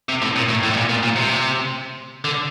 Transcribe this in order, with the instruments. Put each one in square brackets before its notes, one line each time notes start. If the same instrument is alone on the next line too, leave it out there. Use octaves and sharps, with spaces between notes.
[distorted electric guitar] C3
A2
A#2
A2
A2
C3
A#2
A#2
A#2
C3
D3